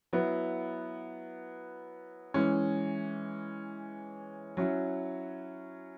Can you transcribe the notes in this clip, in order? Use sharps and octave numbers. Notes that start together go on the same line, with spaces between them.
F#3 B3 E4
E3 G#3 C#4
F#3 C#4 E4